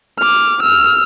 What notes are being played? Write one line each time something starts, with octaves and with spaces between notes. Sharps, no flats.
D6 F6
E6 F6